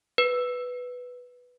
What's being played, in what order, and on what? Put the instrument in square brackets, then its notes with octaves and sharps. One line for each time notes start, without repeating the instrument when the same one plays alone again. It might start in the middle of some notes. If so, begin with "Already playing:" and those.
[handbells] B4